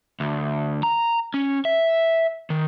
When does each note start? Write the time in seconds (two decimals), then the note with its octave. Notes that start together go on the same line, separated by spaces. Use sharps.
0.20 D2
0.83 A#5
1.34 C#4
1.65 E5
2.50 D#3